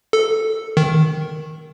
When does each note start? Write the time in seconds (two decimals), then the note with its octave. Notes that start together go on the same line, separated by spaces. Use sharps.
0.13 A4
0.77 D#3